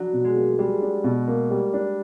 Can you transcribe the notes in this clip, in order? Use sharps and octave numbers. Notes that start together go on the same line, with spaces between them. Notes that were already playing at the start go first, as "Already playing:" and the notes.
Already playing: F#3 D4
B2
G#3
A#3
G3 G#3
D4
B2
A#3
G3
D4